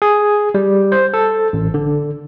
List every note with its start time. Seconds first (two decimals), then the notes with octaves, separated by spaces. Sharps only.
0.02 G#4
0.55 G3
0.92 C5
1.14 A4
1.53 A1
1.74 D3